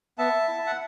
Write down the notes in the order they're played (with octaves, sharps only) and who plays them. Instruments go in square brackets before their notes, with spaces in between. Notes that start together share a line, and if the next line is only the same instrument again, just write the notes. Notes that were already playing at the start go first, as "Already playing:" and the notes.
[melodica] B3 E5 A5
E4
F#5